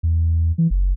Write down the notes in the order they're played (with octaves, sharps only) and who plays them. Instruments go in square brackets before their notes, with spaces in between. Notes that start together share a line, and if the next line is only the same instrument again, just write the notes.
[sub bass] E2
E3
F#1